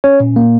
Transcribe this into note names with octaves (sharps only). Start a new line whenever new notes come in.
C#4 C#5
A#2
A#3